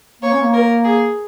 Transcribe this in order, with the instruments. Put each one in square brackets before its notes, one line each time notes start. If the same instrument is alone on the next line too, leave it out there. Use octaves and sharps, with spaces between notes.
[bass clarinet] A#3 [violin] C#5
[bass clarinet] C#4
A#3
[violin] A#4
G#4